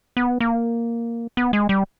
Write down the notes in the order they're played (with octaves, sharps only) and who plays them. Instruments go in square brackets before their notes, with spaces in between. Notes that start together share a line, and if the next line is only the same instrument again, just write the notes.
[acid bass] B3
A#3
B3
G#3
G3